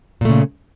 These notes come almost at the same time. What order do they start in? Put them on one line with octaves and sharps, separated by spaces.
A#2 A3 C#3